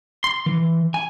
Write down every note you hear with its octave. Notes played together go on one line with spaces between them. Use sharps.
C6
E3
G#5